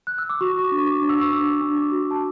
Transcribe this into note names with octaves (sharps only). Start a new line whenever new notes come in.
F#6
E6
D6
F#4 C#6
C#6
D6
D4
C#6
D6
D4 D6
E6
C#6
D4 D6
D4
D6
F#4
A5